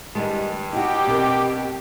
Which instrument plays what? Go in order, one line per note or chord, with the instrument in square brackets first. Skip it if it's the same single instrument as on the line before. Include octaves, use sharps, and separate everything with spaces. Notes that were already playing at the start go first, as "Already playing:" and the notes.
[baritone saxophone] G2 [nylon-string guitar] D#3 G3 G#3
[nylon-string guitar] D#4 F#4 [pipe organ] G4 [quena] G5
[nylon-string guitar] B2 C4 A#4